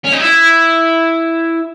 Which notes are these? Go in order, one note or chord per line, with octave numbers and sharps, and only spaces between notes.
C#4
D#4
E4